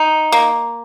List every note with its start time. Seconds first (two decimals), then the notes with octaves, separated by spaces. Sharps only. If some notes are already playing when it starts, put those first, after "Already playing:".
Already playing: D#4
0.32 A#3